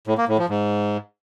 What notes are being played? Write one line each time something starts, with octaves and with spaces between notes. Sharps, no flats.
A2
A#3
A2
F3
G#2